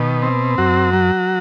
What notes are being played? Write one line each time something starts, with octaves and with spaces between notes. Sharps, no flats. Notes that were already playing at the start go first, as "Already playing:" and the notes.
Already playing: B2 D#3
C4
F#2 F#4
F#3